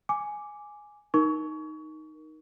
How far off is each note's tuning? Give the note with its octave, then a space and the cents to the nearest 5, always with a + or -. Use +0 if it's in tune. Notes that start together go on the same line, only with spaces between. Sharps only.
G#5 +0 D6 +0
D#4 +0 A#4 +15 C#6 +25